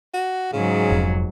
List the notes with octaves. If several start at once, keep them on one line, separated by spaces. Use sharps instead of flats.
F#4
G#2 C#3 F#3
F1 F2